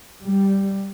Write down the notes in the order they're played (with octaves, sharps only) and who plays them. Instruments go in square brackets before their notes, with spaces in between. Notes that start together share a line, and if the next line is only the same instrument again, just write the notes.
[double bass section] G3